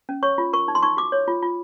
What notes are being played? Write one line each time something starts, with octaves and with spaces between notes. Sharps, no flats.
C#4
C#5 C#6
F4
A#4 C#6
D#4
C6
D#4 C#6
F#4 D6
C#5
F4
F4